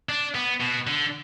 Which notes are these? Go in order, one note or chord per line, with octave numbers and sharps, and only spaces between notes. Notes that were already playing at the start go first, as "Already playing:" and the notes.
D4
B3
B2
D3